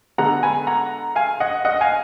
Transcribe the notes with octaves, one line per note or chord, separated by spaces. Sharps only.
D3 G#3 B3 F#5 A#5
G#5 B5
F#5 A#5
F5 G#5
D#5 F#5
D#5 F#5
F5 G#5